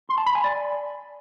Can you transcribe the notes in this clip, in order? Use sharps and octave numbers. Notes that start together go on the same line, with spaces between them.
C6
A5
B5
G#5
D5